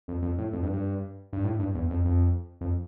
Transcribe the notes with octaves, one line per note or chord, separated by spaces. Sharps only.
F2
F2
A2
F2
G2
G2
G2
A2
G2
E2
F2
F2
F2